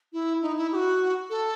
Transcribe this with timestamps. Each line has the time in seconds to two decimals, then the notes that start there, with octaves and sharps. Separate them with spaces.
0.13 E4
0.42 D#4
0.57 E4
0.72 G4
0.76 F#4
1.30 A4